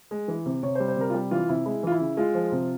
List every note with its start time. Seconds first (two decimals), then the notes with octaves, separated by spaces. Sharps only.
0.11 G#3
0.28 E3
0.46 C3
0.63 C3 C#5
0.75 C5
0.80 G3
0.88 C5
0.96 C3 A#4
1.10 F4
1.14 G3 G4
1.31 E3 F4
1.49 C3 E4
1.66 G#3 E4
1.83 E3 F4
1.92 E4
2.00 C#3
2.17 G#3 F4
2.34 F3
2.52 C3